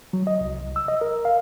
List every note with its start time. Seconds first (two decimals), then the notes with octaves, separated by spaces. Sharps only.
0.13 F#3
0.27 D#5
0.41 C2
0.61 C2
0.76 E6
0.88 D#5
1.01 A#4
1.25 F5